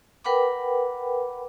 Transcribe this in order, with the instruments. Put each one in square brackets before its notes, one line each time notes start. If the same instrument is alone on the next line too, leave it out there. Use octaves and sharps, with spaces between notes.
[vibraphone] A#4 B4 F#5 G5 B5 D6